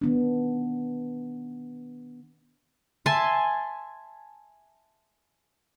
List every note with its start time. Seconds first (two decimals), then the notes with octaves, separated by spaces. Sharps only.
0.02 D#3 B3 D4
3.06 E5 G#5 A5 C6